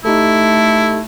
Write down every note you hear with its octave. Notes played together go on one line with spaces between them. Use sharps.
A3 D#4 E4 G4 A4